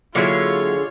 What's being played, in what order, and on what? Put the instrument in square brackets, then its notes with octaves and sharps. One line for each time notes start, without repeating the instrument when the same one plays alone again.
[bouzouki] D3 G#3 [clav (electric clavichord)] F#3 A#3 E4 [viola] F4 C#5